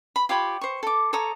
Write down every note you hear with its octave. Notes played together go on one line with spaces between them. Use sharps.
B5
F4 G4 C#5 B5
C5 C#6
A4 D6
A4 C#5 A#5 D#6